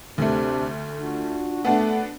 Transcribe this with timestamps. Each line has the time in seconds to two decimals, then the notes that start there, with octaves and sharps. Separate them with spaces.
0.18 D2 C3 A3 D4
1.01 D4 F4 F#4
1.65 A3 B3 D4 F#4